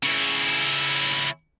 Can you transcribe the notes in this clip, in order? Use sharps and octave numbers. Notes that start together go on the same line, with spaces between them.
C#3 E4